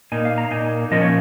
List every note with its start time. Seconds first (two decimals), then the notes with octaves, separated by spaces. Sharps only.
0.12 A#2 A#3 D#4 G#5
0.25 F5
0.38 A#5
0.51 A#2 A#3 D#4 G#5
0.91 A#2 F3 C#4 F4 D#5
1.02 C#5